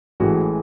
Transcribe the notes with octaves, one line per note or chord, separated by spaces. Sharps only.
A1 A2 E3 G#3 F#4